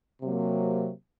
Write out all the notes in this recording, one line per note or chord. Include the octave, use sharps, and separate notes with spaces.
C3 F#3 A#3